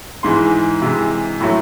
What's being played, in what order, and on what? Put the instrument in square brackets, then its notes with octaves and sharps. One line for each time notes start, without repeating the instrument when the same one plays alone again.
[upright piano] G#2 E3 G#3 C6
C3 E3 G#3
A2 F#3 A3